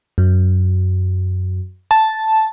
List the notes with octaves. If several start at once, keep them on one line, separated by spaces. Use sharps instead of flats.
F#2
A5